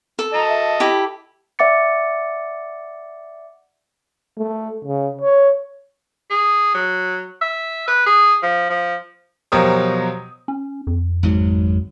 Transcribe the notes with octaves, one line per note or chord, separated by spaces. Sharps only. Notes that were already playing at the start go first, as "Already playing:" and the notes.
A4
D#5 A5 A#5
E5
E4 G4 A4 B5
D5 E5 F#5 D6 A6 C#7
A3
C#3
C#5
G#4
F#3
E5
B4
G#4
F3
F3
B2 F3 F#3 G4 A#4 D#6
C#4
F2
G#1 G#2 F#3